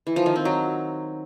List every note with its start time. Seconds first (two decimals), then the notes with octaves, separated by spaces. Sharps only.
0.07 E3
0.16 F3
0.26 D#3
0.36 C4
0.45 F#3